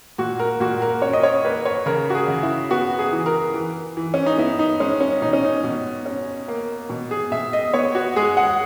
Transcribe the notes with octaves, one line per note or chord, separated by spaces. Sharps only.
A#2 F#4
A#4
A#2 F#4
A#4
C#4 C#5
D#5
C#5
A#3 B4
C#5
C#3 A#4
F#4
G#4
C#3
E4
B3 F#4
G#4
E3
A#4
E3
E3
C#4
D#4
B3 E4
D#4
G#3 C#4
C#4
B2 D#4
C#4
D#4
B2
C#4
A#3
B2
G#4
B2 E5
D#5
B3 C#5
F#4
G#3 G#4
F#5